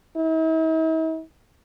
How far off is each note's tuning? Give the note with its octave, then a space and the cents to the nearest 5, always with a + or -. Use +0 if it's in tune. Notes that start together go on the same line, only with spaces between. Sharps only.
E4 -45